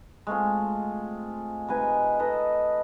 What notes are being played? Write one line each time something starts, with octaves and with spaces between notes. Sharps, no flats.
G#3 A3 C4 F4
C3 D#4 B4 G#5
D#4 A4 B4 D#5